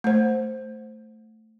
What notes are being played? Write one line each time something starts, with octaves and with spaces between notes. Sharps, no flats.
A3 C5